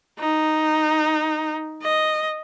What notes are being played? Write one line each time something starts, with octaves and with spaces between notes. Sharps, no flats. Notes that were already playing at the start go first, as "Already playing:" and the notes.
D#4
D#5